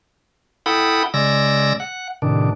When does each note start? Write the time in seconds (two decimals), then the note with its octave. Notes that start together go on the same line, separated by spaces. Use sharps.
0.66 E4 A4 F#5 G5 B5 D#6
1.14 C#3 G#3 D5 E6 A#6
1.80 F#5
2.22 A2 C3 D#3 D4